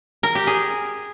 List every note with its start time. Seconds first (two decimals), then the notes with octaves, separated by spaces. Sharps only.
0.23 A#4
0.35 G4
0.47 G#4